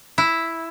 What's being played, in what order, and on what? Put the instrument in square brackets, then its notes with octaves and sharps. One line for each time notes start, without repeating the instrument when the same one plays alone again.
[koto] E4